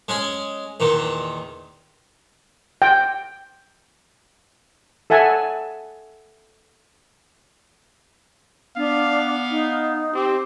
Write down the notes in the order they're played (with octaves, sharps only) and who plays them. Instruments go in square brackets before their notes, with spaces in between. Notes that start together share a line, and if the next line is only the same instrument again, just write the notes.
[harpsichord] G#3 C#4 G#4
E2 A#2 D#3
[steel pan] G5
A4 E5 F#5 G#5 A5
[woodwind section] B3 [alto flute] D4 [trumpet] F5
[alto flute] D#4
[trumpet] C4 [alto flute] G4